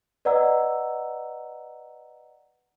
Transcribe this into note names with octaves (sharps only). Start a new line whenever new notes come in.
B4 D5 D#5 F#5 A#5 E6